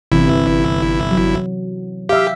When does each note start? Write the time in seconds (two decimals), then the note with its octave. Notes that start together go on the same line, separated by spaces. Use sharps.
0.12 G1 C3 E3 E4
1.11 F#3
2.09 G4 E5 F5